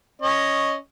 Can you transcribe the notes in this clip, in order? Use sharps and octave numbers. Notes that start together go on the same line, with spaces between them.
C#4 D#5